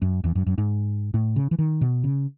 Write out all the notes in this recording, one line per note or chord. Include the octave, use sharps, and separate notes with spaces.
F#2
E2
F#2
F#2
G#2
A2
C#3
E3
D#3
B2
C#3